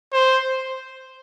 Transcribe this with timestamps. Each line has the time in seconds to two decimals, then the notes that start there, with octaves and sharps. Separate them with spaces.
0.13 C5